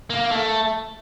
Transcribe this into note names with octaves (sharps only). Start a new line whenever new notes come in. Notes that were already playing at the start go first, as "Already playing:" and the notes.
A#3
A#3
A3